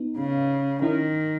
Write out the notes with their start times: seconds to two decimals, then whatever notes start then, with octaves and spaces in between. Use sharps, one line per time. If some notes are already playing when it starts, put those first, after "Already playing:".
Already playing: B3 D#4
0.18 C#3
0.82 D#3 C#4 E4